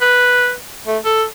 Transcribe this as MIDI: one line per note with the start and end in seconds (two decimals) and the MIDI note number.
0.01 0.53 71
0.87 0.98 57
1.05 1.24 69